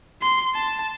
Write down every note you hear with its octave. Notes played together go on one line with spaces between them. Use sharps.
C6
A5